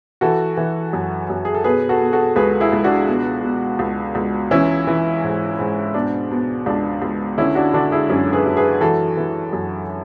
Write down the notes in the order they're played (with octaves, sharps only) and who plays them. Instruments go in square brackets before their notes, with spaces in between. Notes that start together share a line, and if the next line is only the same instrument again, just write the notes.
[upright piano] E3 F#4 A4
E3
F#2
F#2
G#4
A4
B2 G#4 B4
F#4 A4
B2
F#4 A4
C#2 G#4 B4
E4 G#4
C#2
D4 F#4
B2
B2
C#2
C#2
E3 C#4 E4
E3
G#2
G#2
B2 D4
B2
C#2 D4
C#2
D3 C#4 E4
D4 F#4
D3 D4 F#4
E4 G#4
F#2 C#4
G#4 B4
F#2
G#4 B4
E3 F#4 A4
E3
F#2